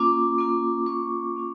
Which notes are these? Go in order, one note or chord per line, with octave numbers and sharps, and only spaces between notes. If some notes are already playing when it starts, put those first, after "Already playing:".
Already playing: A#3 C#4 F4 D6
A#3 C#4 F4
A#3 C#4 F4 C#6
A#3 C#4 F4